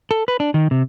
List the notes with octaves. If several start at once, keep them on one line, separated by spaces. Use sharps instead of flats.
A4
B4
D4
D#3
C3